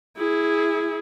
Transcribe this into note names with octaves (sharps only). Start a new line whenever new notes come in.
E4 G#4